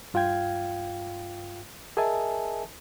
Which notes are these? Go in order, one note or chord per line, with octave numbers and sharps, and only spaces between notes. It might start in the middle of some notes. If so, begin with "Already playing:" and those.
G2 F4 F5 G5 G#6
G#4 A#4 D#5 E5 G#5 A5